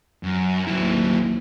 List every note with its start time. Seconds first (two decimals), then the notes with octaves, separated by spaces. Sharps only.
0.23 F#2
0.67 A1 D#2 F#3 E4